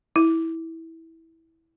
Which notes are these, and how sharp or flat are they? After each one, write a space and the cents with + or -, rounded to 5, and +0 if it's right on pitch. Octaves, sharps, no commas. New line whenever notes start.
E4 -15